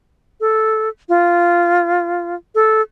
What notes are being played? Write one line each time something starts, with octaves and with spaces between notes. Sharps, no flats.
A4
F4
A4